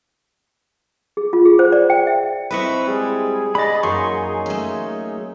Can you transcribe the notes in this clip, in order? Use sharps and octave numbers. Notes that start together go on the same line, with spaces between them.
G#4
F4
G#4
C5
D5
G5
E5
C4 E4 A4 B4 D#5 C#6
G3 G#3 G#4
B3 D4 D#5 B5 A6
F#2 F#3 A#3 D#4 C6 C#6
A3 C#4